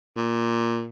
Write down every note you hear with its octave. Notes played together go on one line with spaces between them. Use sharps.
A#2